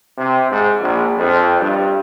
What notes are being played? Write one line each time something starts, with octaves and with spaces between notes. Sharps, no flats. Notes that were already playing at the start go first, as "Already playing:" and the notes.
C3
G#2
A#1
F2
G2